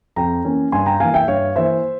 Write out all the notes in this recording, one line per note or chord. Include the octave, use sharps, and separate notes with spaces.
F2 G5 A#5
E3 A#3 C#4
G2 G#5 C6
G5 A#5
E3 A#3 F5 G#5
E5 G5
G2 C#5 F5
E3 A#3 C5 E5